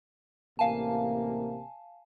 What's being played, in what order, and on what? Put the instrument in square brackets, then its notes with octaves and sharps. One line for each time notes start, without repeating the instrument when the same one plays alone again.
[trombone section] A1 C3 A#3 [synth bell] F5 G#5 A5